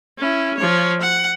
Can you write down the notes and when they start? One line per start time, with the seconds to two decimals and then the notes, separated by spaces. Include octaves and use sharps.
0.19 C#4 E4
0.57 F3 C#5
1.01 F#5